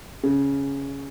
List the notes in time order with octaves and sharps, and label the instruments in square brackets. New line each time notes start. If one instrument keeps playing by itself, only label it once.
[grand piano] C#3